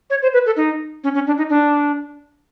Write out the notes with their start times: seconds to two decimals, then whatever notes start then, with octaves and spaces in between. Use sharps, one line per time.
0.10 C#5
0.22 C5
0.33 B4
0.46 A4
0.57 D#4
1.04 C#4
1.14 C#4
1.27 D4
1.38 D#4
1.50 D4